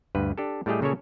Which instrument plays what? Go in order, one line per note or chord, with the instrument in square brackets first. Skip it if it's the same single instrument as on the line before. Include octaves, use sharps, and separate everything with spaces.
[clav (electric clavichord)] D2 G2 B4
D4 G4 A4
A2 G3 A3 G4 G#4 D#5
A#2 C#3 A4 A#4 C#5 G#5